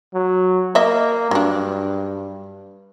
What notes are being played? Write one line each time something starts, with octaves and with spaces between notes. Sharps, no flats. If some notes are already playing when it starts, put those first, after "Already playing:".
F#3
A#3 D#5 E5
G2 F#3 D4